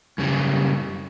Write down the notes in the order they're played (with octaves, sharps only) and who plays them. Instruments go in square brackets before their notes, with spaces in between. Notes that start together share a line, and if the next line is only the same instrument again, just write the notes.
[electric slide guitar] F#2 C#3 G3